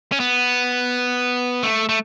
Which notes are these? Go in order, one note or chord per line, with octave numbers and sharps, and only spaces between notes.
C#4
B3
A3
A3